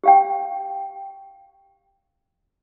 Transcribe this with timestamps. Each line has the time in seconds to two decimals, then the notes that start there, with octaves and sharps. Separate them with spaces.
0.04 G4 F5 G5